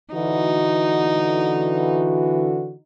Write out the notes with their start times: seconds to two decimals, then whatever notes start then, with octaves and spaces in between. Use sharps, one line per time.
0.14 D3 E3 D#4 F#4